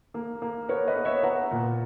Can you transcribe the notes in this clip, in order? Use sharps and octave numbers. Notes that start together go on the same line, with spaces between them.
A#3
A#3
B3 A#4 C#5
B4 D#5
B3
C#5 E5
B3 F#5 A#5
A#2